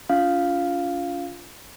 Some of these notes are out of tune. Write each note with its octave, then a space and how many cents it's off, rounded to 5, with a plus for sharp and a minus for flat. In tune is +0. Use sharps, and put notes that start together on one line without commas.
C#4 +45 F4 +0 F5 +0